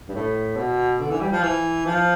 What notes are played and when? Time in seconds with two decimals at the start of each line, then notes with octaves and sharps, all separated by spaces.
0.09 G2
0.15 A2
0.56 B2
1.00 D3
1.11 E3
1.21 G3
1.33 F3
1.43 E3
1.86 F3